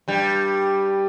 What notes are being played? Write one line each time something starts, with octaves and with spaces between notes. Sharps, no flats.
G2 G3